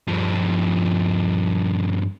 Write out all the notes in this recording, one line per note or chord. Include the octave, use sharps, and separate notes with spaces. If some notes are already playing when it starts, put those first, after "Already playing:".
G2 F3